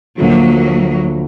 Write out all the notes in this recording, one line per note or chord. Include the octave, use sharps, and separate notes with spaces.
D2 D3 F3 F#3 A#3